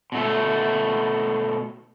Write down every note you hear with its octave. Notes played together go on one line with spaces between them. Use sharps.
B2 A3